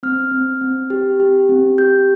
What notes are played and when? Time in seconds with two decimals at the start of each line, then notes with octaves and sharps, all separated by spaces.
0.03 C4 F6
0.32 C4
0.61 C4
0.90 G4
1.20 G4
1.49 C4
1.78 G4 G6